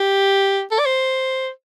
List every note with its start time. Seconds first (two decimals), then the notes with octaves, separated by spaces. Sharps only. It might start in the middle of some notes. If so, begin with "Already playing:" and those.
Already playing: G4
0.71 A4
0.79 D5
0.85 C5